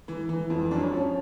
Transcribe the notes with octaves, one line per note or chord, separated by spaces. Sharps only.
E3
E3
F2
F#2 D4
C#4
F3 C#4